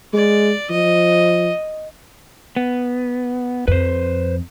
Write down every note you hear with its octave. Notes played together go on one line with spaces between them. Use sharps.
G#3 D5
F3 D#5
B3
F2 B4 C5